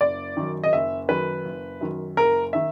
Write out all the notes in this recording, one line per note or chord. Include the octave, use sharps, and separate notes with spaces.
F#1 D5
F#2 D#3
D#5
F#1 E5
F#2 D#3 B4
F#1
F#2 D#3
F#1 A#4
D#3 E5